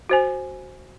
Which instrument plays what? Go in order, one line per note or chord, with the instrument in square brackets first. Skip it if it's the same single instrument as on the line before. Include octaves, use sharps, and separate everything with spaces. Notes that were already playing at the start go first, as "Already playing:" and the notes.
[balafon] F#4 C5 G#5